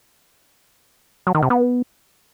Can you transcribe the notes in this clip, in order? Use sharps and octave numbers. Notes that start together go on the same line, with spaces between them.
F#3
D#3
C3
B3